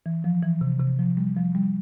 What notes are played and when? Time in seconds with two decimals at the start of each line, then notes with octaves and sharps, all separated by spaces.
0.06 E3
0.24 F3
0.43 E3
0.61 C3
0.80 C3
0.99 F3
1.17 G3
1.37 F3
1.55 G3